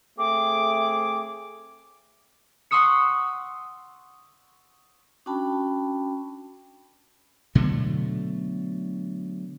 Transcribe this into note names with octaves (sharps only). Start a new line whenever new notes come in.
A3 C4 G#4 D6
F#5 C6 C#6 D#6 E6 C#7
C#4 D4 F#4 G5 A5 B5
B2 D3 F#3 A3